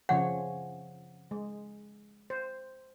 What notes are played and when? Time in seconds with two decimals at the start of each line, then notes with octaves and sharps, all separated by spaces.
0.09 C#3 F3 C#5 F#5
1.31 G#3
2.30 C5